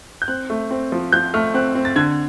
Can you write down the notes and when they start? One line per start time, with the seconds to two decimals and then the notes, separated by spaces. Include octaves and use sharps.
0.22 G6
0.28 C4 F#6
0.50 A3
0.71 C4
0.92 F3
1.12 F3 G6
1.34 A3 F6
1.54 C4 F#6
1.75 C4
1.85 A6
1.96 D3 G#6